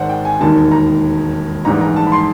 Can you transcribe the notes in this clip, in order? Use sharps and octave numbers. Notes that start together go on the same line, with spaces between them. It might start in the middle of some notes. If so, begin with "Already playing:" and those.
Already playing: G#1 G#2 D#3 C5 D5 F#5
G5
G#5
E1 D#2 D#3 G3 A5
A#5
A#1 G#2 E3 G3 A#5
A#5
A5
B5
C6